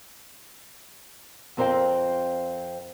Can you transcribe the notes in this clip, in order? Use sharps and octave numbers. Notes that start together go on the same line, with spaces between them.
F2 C4 A#4 C5 F5 G5